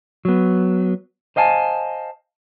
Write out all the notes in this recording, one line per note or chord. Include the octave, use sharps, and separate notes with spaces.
F#3 B3
C5 D#5 F5 G#5 A5